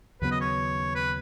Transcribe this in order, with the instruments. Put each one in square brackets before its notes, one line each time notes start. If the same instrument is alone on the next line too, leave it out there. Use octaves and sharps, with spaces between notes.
[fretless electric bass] D#2 C#3 F#3 B3 [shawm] B4
[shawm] D#5
C#5
B4